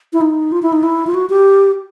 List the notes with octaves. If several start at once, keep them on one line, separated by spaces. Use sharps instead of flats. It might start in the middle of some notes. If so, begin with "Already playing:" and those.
E4
D#4
F4
E4
D#4
E4
F4
F#4
G4